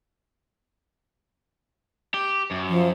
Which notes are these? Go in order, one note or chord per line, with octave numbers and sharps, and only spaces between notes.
G4
F#2
F3